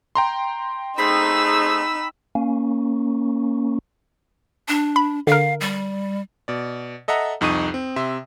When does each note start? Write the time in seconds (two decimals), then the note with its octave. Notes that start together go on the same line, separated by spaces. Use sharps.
0.15 G5 A#5 C6
0.98 A3 C4 D#4 G#4 B5 E6
2.35 A#3 C#4
4.68 D4
4.96 B5
5.27 D3 A#4 F5
5.60 G3
6.48 B2 D5
7.08 A4 D#5 E5 F#5 A#5
7.41 C2 F2 D#4 C#6 D#6 D#7
7.74 C4
7.96 C3 E5 C6